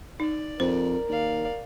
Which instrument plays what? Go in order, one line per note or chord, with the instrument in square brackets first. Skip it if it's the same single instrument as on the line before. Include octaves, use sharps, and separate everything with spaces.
[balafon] D#4 [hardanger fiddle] D5
[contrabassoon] F2 [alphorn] A#4 [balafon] C5
[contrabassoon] D#2 [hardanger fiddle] D5 F5